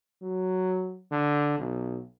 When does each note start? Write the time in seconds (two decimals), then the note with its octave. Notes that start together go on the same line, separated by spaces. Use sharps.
0.22 F#3
1.12 D3
1.59 B1